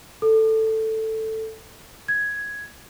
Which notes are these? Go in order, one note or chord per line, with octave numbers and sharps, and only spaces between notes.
A4
G#6